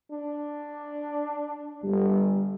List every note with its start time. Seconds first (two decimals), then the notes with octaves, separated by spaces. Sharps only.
0.11 D4
1.84 G1 G3